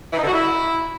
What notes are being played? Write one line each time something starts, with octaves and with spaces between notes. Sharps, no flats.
E3
D#4
D3
F#4
E4